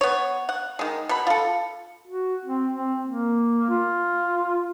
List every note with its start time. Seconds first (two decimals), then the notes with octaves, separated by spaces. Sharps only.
0.01 B3 C#5
0.49 F#5
0.79 D#3 G#3
1.09 B2 B5
1.27 F4 A4
2.07 F#4
2.45 C4
2.73 C4
3.07 A#3
3.69 F4